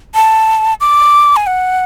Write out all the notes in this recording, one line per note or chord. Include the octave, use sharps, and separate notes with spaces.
A5
D6
G#5
F#5